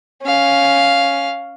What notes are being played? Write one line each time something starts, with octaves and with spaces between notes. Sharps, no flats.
C#4 F5